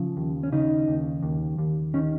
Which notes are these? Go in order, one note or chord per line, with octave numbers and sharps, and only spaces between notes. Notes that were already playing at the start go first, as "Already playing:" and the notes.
Already playing: C#3 F3
D#2
C#4
C#3 D#4
D#2
D#2
D#2
D#3 C#4